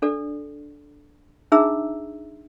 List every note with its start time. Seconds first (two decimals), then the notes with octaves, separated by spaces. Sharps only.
0.02 D4 A4 D5
1.52 D4 D#4 G#4 E5 A#5 E6